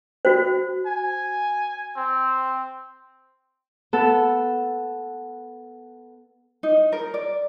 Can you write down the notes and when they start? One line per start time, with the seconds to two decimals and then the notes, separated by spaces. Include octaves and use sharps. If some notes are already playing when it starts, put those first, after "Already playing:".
0.25 F#4 C5
0.86 G#5
1.97 C4
3.93 B3 A4
6.63 D#4
6.92 A#4
7.14 D5